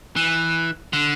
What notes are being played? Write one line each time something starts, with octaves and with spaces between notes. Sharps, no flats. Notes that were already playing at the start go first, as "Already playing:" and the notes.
E3
D3